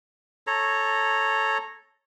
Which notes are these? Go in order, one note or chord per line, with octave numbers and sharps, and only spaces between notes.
A4 C#5 A#5